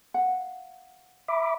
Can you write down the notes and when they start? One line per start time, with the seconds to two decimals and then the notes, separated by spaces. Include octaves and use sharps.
0.14 F5 F#5
1.28 E5 B5 D6